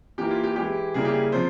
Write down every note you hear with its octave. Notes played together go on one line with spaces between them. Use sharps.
E3 A#3 E4 G4
F4
G4
E3 G#3 E4 G4
C#3 G3 A#3 E4 G#4
G4
G#4
C3 F3 C5